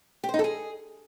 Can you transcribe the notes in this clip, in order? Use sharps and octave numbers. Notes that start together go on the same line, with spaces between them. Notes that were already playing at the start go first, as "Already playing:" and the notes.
G4
C5
D#4
A4
G#4